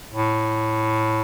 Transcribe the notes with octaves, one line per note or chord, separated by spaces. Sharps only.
A2